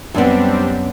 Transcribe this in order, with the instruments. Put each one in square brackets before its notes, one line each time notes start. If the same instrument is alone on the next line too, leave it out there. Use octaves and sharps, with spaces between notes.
[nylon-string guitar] F#2 B3 [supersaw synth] G3 C4 D4